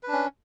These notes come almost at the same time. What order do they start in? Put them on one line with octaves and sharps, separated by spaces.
B4 D4 C#4